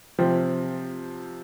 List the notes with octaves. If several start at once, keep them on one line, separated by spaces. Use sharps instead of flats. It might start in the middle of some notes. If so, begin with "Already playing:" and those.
C3 F3 C4